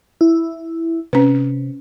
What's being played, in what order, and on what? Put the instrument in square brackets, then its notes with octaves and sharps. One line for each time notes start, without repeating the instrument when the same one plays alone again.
[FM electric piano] E4
[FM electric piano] C3 [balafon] C#4 B4